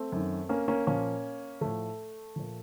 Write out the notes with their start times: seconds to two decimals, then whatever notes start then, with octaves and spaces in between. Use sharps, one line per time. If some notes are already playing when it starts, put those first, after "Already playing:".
Already playing: A3 C4
0.12 F#2 D#3
0.49 A#3 C#4
0.68 A#3 C#4
0.87 A#2 F3 A#3 C#4
1.61 A2 F3 A3
2.36 A#2 F3